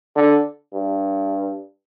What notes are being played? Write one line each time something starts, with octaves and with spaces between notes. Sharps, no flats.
D3
G2